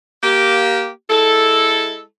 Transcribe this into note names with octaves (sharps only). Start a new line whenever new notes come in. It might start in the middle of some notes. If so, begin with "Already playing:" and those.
A#3 G4
G#3 E4 A4